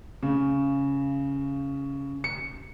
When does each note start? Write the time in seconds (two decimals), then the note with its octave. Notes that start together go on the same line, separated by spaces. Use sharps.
0.23 C#3
2.24 C#7